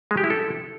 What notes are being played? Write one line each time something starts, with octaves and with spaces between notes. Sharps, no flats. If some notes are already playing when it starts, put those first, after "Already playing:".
G#3
G4
E4
A4